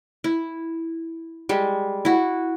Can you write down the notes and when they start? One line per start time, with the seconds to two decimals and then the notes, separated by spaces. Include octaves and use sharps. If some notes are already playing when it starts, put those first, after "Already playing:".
0.24 E4
1.49 G3 G#3
2.05 E4 F#4